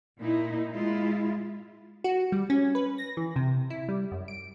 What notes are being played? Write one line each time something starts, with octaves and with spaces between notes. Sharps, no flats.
A#2 A#3 D#4 E4
G#3 E4 F4
F#4
G3
C#4
B4
A#6
E3
C3
E4
G3
F#2
D7